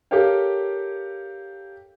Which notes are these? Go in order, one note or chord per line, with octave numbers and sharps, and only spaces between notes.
G4 A4 A#4 C#5 F5 G5